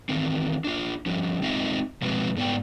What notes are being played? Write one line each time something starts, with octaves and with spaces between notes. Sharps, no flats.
D#3 E3 C4
D4 F4
F3 G3 C#4
G#3 C4 D#4 F4 D#5 E5
B2 F3 F#3 G#3 C4 B4
G#2 B3 D5 G5